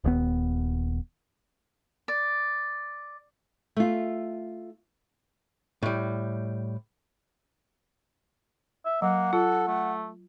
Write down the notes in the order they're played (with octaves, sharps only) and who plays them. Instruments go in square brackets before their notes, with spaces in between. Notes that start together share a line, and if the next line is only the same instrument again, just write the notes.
[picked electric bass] D#1 D#2 B3
[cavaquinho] D5
[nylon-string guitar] A3 F4
[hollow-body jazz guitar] A2 G3
[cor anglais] E5
[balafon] F#3 [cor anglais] A#3 [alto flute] F#5
[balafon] F4 [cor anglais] A4
[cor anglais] A3